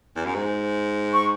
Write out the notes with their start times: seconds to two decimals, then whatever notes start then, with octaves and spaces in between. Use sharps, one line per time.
0.16 E2
0.26 F#2
0.35 G#2
1.13 C#6